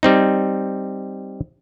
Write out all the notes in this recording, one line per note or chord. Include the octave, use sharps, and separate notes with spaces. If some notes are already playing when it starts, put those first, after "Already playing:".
G3 C4 D#4